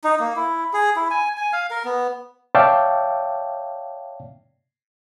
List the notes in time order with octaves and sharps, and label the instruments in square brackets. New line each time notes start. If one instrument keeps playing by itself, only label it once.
[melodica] D#4
A#3
E4
G#4
E4
G#5
G#5
F5
A#4
B3
[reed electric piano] C#5 D5 E5 F5 G5 A5